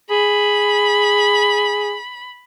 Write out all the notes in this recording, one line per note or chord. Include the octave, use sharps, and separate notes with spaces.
G#4 B5